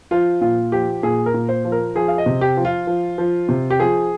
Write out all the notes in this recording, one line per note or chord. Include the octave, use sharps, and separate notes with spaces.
F3 F4
A#2 F4
F3 G4
A#2 G#4
A#4
A#2
C5
F3
A#4
F3 G#4
F5
D#5
C3
G4
F3
F4
F3
F3
C3
G4
F3 G#4